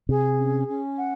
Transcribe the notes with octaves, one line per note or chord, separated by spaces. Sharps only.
C3 G#4
C#4
C#4
F#5